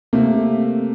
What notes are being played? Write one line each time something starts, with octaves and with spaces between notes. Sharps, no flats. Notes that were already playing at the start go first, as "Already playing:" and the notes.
C3 A3 A#3